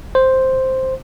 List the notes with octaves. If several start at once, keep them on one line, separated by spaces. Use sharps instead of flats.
C5